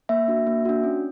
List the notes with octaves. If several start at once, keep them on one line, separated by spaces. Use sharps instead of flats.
A#3 E5
D4 F#4
A#3
D4 F#4
C#4